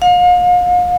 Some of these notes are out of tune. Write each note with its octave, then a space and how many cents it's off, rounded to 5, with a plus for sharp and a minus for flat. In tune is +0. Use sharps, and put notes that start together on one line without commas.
F5 +40